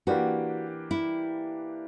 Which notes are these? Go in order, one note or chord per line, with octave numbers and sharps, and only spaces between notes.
E3 A#3 D4 F#4 G4 B4
E4